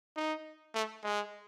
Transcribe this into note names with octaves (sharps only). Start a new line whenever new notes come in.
D#4
A3
G#3